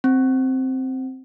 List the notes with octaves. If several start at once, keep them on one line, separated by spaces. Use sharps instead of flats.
C4